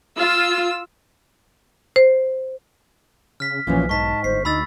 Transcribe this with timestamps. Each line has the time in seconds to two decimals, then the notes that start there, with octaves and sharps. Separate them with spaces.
0.17 F4 E6
1.96 C5
3.40 C#3 F6 B6
3.67 B1 A#2 E3 F3 C#4
3.89 G#2 A5 C#6 B6
4.24 G1 C5 C7
4.45 D2 D#4 B5 E6 A6